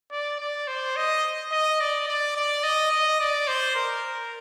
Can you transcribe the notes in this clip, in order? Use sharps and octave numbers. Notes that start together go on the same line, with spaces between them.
D5
D5
C5
D#5
D#5
D5
D5
D5
D#5
D#5
D5
C5
A#4